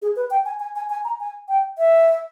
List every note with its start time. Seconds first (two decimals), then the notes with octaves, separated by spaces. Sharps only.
0.02 G#4
0.16 B4
0.31 G5
0.45 G#5
0.60 G#5
0.76 G#5
0.90 G#5
1.05 A#5
1.20 G#5
1.48 G5
1.78 E5